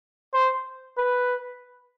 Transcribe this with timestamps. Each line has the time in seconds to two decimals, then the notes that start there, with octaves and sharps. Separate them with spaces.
0.34 C5
0.97 B4